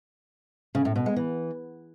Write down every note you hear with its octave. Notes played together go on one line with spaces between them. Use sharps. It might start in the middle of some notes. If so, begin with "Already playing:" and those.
C#3
A2
B2
G#3
E3